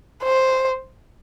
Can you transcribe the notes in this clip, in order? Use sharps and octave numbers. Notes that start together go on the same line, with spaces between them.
C5